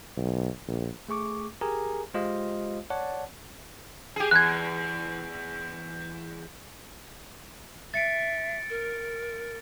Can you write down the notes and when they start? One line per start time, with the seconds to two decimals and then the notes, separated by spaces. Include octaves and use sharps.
0.17 B1
0.68 A#1
1.09 A3 G#4 C#6 D6
1.61 G4 G#4 A#4 G#5 A#5
2.14 G#3 F4 G4 C5 D#5 F5
2.90 C#5 D5 F#5 A5
4.16 G4 G#4
4.31 E2 F#6 G#6
7.94 E5 A6 C#7 D7
8.70 A#4